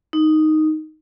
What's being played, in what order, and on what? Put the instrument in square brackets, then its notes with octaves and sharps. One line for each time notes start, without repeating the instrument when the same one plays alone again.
[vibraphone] D#4